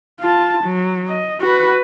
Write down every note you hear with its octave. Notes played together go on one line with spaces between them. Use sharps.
F4 A5
F#3
D#5
F#4 B4